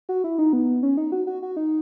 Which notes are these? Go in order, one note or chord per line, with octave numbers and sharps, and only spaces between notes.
F#4
E4
D#4
B3
C#4
D#4
F#4
F#4
F#4
D#4